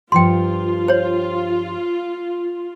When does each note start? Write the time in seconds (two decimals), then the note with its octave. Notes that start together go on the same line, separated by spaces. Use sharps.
0.12 G2 F3 F4 G4 G5 C6
0.88 C5 C#5